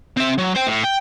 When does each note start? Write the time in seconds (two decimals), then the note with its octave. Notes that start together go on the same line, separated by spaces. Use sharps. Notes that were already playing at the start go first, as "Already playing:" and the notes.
0.17 C4 E5
0.38 F#3
0.55 C5 G5
0.67 A2
0.84 G5